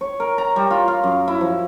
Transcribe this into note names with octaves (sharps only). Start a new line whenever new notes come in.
C#5
A#4
A#5
G3
F4
F5
F#2
E4
F3